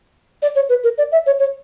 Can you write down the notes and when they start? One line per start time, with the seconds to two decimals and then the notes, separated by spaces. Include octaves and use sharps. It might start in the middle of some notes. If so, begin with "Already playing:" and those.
0.42 D5
0.55 C#5
0.69 B4
0.84 A#4
0.98 D5
1.12 E5
1.26 C#5
1.39 C#5